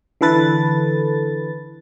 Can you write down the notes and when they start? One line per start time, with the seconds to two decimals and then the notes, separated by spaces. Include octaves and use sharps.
0.21 D3 E3 A4 B4 A6